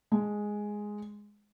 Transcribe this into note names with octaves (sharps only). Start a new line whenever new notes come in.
G#3